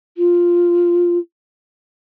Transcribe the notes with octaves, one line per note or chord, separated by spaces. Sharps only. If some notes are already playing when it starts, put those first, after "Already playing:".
F4